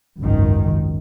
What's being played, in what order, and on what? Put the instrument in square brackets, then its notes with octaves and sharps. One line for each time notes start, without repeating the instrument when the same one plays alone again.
[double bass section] G#1 C#2 F#2 D#3